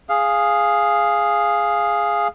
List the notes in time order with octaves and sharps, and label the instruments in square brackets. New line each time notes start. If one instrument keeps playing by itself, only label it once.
[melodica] G#4 F5